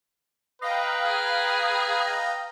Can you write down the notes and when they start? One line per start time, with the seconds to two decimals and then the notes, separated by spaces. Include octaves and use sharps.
0.62 B4 D#5 F5 G5 A#5
1.04 G#4
2.04 D#5